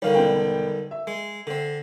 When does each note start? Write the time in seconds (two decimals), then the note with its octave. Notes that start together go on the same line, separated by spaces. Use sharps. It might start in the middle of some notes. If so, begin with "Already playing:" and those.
0.02 D3 D#3 G3 C#5 F5
0.15 E1 B3 G5
0.91 E5
1.07 G#3
1.47 D3 C4